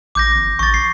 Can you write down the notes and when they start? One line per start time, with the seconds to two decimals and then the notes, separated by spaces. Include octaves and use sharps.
0.15 A1 D6 G6 A#6
0.35 G1
0.59 A1 C#6 A6
0.74 C7